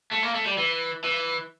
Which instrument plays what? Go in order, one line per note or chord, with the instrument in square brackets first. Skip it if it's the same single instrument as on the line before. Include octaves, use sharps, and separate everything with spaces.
[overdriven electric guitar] A3
A#3
A3
G3
E3
E3